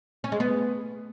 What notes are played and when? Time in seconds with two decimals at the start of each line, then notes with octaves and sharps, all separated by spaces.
0.24 C#4
0.32 G#3
0.40 B3